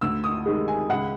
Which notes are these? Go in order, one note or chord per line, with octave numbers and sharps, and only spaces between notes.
D2 E6
D#6
C3 D#3 G#3
G#5
C#2 F#5